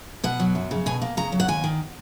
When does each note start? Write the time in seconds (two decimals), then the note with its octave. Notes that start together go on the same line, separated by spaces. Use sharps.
0.24 B2 F#5
0.39 F#3
0.55 F#2
0.71 C#3
0.86 B2 G#5
1.02 A#3
1.17 C#3 A#5
1.32 F#3
1.40 F#5
1.48 D#2 G#5
1.64 D#3